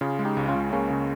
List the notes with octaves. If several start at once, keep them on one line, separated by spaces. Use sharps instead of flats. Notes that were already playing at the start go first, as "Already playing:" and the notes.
C#3 F4 G#4
G#3
D#4 G4
C#2
C#4 F4
C#2
C#3 A#3 C#4
C#3